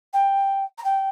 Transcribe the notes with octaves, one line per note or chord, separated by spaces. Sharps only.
G5
A#5
G5